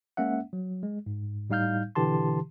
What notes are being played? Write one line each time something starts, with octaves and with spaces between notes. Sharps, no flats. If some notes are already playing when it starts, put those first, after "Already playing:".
G#3 A#3 C#4 E5 F#5
F#3
G#3
G#2
A2 G3 D#4 F5 F6 G6
B2 D3 E3 G4 A5 C6